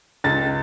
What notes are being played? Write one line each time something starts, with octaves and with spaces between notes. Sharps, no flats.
C#2 A6